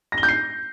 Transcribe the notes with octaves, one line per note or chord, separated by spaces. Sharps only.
A#6
G7
G6
C7